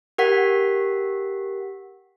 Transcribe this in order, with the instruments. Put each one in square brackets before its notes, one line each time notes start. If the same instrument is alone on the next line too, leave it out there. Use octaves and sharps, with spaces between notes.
[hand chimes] G4 A#4 F#5 B6